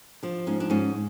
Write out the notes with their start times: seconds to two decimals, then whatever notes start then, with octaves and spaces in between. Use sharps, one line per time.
0.23 F3 D4
0.47 G#2 C#4
0.60 D4
0.70 G#2 C#4